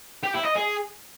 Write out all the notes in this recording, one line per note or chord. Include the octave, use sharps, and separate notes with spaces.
G4
E4
D#5
G#4